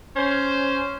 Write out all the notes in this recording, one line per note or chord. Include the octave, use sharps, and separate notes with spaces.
C#4 C5